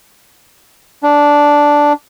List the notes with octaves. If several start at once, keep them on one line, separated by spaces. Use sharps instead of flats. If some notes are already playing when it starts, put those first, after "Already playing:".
D4